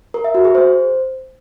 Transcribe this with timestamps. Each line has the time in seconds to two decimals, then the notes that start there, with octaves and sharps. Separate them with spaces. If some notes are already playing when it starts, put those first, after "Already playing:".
0.14 A#4
0.24 E5
0.35 F#4
0.45 G#4
0.55 C5